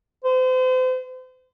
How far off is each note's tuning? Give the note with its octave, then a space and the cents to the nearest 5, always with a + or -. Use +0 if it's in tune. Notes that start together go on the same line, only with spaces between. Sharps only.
C5 -35